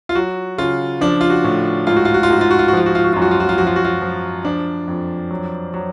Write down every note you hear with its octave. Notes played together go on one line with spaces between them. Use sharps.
F4
F#3 F#4
C#3 F4
F3 D4
F4
F#4
A2
G#2 F4
F#4
F4
F#4
F4
G#2 F#4
F4
F#4
F4
F#4
F3 F4
F#4
F4
F#4
F#2 F4
F#4
F4
F#4
F4
F3 F#4
F4
F#4
F4
F3
F3 D4
F2
F#3
F#3